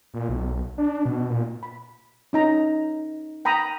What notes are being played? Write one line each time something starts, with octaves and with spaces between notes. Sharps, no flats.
A#2
B1
D4
B2
A#2
B5
C#4 D#4 A#5
G5 A#5 B5 D#6